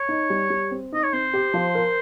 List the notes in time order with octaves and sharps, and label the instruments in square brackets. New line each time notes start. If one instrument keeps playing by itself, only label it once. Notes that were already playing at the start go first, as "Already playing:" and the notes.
Already playing: [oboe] C#5
[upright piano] D#4
G3
G3
C4
[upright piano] D#4 [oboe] D#5
[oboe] C#5
[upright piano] C4 [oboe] C5
[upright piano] G4
F3
A#4